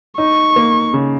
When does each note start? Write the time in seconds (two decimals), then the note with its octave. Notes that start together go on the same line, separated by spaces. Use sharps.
0.18 D#4 C#6
0.56 A#3
0.94 C#3